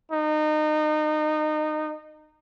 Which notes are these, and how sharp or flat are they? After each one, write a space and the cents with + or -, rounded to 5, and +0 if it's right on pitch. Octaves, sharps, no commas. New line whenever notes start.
D#4 -25